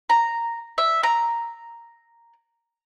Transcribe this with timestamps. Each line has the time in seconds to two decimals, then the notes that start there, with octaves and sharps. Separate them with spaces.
0.09 A#5
0.78 E5
1.03 A#5